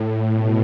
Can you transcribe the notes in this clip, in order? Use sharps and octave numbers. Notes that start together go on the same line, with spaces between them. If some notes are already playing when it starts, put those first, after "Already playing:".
Already playing: A2
B2